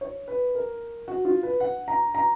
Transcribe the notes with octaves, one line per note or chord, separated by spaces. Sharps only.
C#5
B4
A#4
F#4
F4
B4
F#5
A#5
A#5